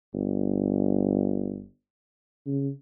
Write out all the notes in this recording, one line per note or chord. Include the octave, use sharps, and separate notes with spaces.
G1
C#3